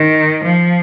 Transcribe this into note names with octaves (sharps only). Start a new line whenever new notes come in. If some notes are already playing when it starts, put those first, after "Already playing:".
Already playing: D#3
F3